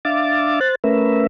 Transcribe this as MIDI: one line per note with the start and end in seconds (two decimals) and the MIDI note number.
0.05 0.60 62
0.05 0.60 76
0.05 0.60 77
0.05 0.60 86
0.05 0.60 93
0.61 0.75 72
0.61 0.75 90
0.61 0.75 93
0.84 1.27 57
0.84 1.27 61
0.84 1.27 70
0.84 1.27 71
0.84 1.27 76